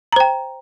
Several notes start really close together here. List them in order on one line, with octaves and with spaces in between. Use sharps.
A#5 C5 G5